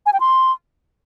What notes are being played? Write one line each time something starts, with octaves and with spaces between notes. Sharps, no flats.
G#5
G5
C6